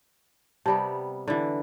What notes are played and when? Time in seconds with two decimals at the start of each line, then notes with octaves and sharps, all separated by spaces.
0.66 C3 G3 B3 A5
1.28 D3 E3